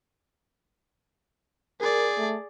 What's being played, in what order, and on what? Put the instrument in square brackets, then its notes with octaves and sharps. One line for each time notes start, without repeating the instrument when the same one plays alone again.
[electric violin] G#4 D5 [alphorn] A#4
[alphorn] A3